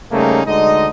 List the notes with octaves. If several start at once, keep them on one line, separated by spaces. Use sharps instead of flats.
C#3 G3 A3 A#3 C#4 D#4
D2 D3 G#3 D#4 D#5